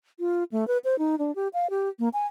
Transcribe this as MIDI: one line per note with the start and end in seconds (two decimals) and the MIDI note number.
0.19 0.44 65
0.52 0.67 57
0.68 0.78 71
0.84 0.98 72
0.99 1.16 63
1.19 1.34 62
1.35 1.48 67
1.54 1.70 77
1.70 1.89 67
1.99 2.09 58
2.13 2.27 80